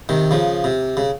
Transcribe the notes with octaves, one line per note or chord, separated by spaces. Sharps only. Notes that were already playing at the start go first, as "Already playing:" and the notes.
C3 D#3
C#3 F3
C3
C#3